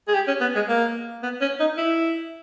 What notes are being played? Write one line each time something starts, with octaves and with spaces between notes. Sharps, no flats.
G#4
G4
C#4
B3
G#3
A#3
B3
C#4
D#4
E4